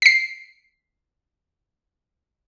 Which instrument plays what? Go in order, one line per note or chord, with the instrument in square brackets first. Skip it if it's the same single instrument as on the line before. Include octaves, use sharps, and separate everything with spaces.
[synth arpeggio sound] B6 C7